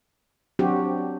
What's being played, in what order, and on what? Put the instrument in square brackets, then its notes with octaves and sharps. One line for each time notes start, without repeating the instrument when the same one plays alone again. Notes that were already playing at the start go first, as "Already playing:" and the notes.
[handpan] F#3 C4 D4 F#4 G4